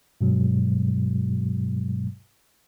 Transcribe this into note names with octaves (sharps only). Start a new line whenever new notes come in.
G2 B2 F#3 G#3